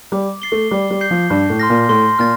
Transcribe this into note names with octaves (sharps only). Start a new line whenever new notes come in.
G3 D6
A6 C7 G7
A3
G3 D6
G3
G6 C7 G7
F3
G2 A5
A2
C6 F6 A#6
A#2
A2 C6
A#2 F6 A6